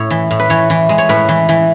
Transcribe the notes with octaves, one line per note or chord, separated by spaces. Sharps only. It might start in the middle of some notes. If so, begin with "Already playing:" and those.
Already playing: A2 C#5
E3
A2
B4
E3 C#5
E3
G#3
C#5
A2 B4
E3
E3